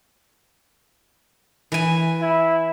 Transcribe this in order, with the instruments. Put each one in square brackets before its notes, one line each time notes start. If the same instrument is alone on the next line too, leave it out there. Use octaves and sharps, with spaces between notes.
[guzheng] E3 G#5
[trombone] E4